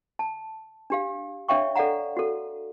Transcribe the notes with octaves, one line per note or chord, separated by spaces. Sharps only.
A5
D4 G4 F5
D4 C#5 E5 F5 G5 C#6
A4 D5 F5 F#5 A#5
F#4 A4